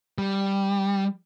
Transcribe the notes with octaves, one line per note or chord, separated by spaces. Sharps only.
G3